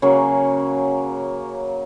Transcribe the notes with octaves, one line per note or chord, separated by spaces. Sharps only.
C#3 F#3 A#3